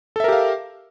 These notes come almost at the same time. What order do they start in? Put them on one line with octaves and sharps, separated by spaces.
A4 E5 A#4 G4 F5